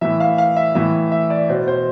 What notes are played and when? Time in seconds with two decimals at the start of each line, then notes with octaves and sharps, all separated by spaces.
0.01 A2 E3 E5
0.20 F5
0.38 F5
0.56 E5
0.75 A2 E3 E5
1.12 E5
1.30 D5
1.49 B2 C5
1.68 C5